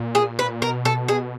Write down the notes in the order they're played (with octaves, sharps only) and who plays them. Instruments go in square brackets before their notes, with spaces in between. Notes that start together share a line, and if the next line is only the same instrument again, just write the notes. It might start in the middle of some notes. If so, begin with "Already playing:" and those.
Already playing: [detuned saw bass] A#2
[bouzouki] G#4
B4
[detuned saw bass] B2 [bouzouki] A#4
[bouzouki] A4
G#4